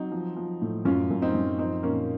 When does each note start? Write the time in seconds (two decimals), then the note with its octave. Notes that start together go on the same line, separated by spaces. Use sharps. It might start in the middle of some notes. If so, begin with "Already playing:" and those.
Already playing: F#3 C4 D#4
0.12 F3
0.37 F3
0.62 A2
0.85 F#2 C#4 F4
1.10 F#2
1.22 C4 D#4
1.34 F#2
1.58 F3 C4 D#4
1.83 A#2 A#3 C#4